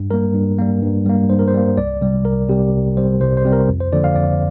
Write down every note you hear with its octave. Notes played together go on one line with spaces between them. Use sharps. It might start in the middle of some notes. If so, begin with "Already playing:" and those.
Already playing: G2
G3 A#3 A#4
G2
G3 A#3
G2
G3 A#3
G2 C5
A#4
C5
G3 A#3
C2 D5
C3 G3
C2 A#4
C3 G3 G4
C2
C3 G3 C5
C2 C5
C5
C3 G3
A#4
F2
C5
D3 F3 A#3 D5
F5
F2 D5